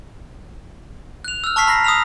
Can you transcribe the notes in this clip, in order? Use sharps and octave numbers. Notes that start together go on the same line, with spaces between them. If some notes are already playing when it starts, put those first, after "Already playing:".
F#6 F7
E6 F6
A5 C#6 F6 B6 C7
A#5 B5 F6 A#6 C7
D#6 E6 F7